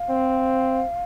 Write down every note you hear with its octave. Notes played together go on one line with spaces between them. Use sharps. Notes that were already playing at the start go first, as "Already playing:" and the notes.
Already playing: F5
C4